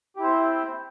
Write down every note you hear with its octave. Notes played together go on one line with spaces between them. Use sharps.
C4 E4 G4 C5